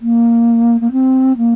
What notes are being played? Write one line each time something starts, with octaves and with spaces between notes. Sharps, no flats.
A#3
A#3
C4
A#3